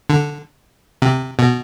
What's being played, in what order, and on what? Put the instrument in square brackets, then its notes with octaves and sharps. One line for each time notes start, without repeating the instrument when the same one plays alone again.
[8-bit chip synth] D3
C3
B2